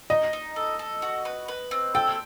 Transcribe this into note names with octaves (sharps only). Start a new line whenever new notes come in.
D#4 D#5
D#4
A4
A4
F#4
B4
B4
C4
A4 G5